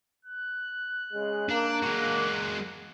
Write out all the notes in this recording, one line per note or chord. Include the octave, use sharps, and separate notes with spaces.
F#6
C#3 G#3
A#3 D4
G#3 F#4